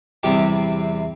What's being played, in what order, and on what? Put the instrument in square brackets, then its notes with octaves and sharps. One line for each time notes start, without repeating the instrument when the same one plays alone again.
[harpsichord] E2 C3 G3 C4 G4